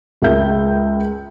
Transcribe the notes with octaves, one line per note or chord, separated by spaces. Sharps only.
C#2 G#3 A#4 E5 G6